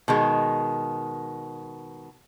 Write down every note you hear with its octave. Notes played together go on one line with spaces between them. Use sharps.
B2 D#3 G#3